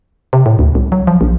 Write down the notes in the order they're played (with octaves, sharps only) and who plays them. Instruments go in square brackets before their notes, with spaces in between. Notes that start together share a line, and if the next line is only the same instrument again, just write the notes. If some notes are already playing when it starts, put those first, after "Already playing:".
[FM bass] C3
A2
D2
C2
F#3
F3
A#1